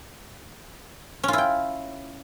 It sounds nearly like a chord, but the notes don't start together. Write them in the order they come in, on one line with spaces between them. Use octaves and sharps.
C#4 F4 E4 G5